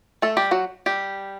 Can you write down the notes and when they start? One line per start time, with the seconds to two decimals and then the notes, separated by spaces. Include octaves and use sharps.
0.22 A3 A4
0.37 G3 G4
0.51 F#3 F#4
0.86 G3 G4